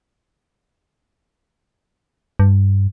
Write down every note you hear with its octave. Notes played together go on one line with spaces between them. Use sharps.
G2